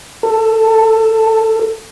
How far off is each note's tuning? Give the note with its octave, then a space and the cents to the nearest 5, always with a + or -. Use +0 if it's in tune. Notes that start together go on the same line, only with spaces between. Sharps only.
A4 +15